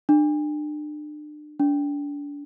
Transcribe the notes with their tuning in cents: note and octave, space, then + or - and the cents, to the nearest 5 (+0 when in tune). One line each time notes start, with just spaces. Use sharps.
D4 +35
D4 -30